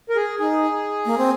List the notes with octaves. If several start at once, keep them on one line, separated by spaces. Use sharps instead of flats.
A#4
G#4
D#4 G#4
A#3
C4